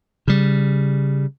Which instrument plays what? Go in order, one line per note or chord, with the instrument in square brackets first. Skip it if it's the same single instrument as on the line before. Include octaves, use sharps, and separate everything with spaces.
[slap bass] C#3 G3